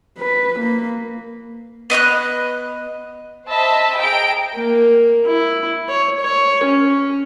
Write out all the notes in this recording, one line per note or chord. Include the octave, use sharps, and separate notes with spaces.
B4
A#3
B3 D#5 C6 F#6
C5 D#5 E5 A5 B5
G#4 G5 A#5 D7
A#3
E4
C#5
C#5
C#4